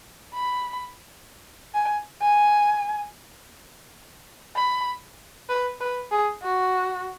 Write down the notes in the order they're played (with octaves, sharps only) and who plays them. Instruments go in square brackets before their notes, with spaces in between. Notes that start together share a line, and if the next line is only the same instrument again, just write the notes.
[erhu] B5
G#5
G#5
B5
B4
B4
G#4
F#4